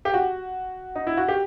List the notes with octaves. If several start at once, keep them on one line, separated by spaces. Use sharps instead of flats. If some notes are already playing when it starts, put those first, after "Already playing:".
G4
F#4
D#4
E4
F#4
G4